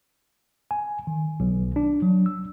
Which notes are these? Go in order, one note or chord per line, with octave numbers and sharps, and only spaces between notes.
G#5
D#3
B1
D4
F#3
E6